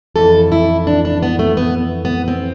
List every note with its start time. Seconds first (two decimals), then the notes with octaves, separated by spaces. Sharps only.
0.16 F2 E3 A4
0.52 E4
0.87 D4
1.05 D4
1.23 B3
1.39 A3
1.57 B3
2.05 B3
2.28 C4